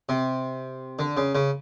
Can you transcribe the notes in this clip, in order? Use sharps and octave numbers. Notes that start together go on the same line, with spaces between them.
C3
D3
C#3
C#3